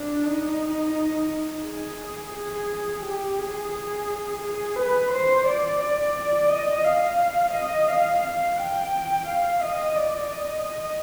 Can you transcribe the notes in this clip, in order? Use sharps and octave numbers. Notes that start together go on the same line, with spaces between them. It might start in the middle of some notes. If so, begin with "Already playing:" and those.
Already playing: D4
D#4
G#4
G#4
G4
G#4
G#4
G#4
B4
C5
D5
D5
D#5
F5
D#5
F5
F5
G5
F5
D#5
D5
D#5